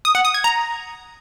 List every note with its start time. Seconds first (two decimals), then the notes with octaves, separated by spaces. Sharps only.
0.05 D#6
0.15 F#5
0.25 D#6
0.34 G#6
0.44 A#5